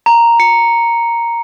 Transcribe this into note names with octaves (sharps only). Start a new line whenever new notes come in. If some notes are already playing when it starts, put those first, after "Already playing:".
A#5
C#7